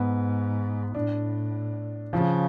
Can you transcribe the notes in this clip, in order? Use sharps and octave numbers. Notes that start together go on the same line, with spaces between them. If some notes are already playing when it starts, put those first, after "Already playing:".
Already playing: G#2 B3
A2 D4
C#3 F3